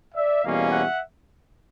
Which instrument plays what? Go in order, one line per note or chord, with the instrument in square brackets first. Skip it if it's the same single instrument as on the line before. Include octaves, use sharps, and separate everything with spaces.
[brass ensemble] D5 E5
E2 B2 G3 A#3 C#4 D#5 F5
E5 F#5